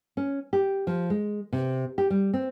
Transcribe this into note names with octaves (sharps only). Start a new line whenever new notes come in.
C#4
G4
F3
G#3
C3
G4
G3
C4